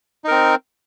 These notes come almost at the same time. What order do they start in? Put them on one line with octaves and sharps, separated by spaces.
D#4 A#4 C4